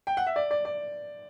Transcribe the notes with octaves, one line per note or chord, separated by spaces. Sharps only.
G5
F#5
E5
D5
D5
D5